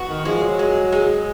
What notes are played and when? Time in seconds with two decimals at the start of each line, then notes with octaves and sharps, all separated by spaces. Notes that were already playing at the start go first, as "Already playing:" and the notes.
Already playing: B3 F#4
0.09 D#3
0.25 F3 G#3
0.43 F#3
0.59 G#3
0.92 G#3